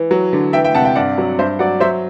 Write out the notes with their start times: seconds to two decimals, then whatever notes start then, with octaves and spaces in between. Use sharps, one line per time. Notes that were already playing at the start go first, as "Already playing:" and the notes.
Already playing: E3
0.11 F#3
0.33 D3
0.53 E3 E5 G5
0.65 E5 G5
0.75 C3 F#5 A5
0.85 E5 G5
0.96 G2 D5 F#5
1.18 F#3
1.39 G2 C5 E5
1.59 F#3 D5 F#5
1.80 F#3 C5 E5